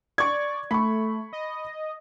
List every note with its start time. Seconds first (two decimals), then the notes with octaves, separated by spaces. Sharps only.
0.18 D5 C#6 G#6
0.71 A3 B5 C#6
1.33 D#5